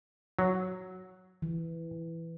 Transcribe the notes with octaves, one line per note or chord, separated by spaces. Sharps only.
F#3
E3